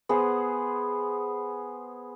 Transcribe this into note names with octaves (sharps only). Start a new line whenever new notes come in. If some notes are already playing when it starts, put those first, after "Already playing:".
B3 G#4 C5 F#5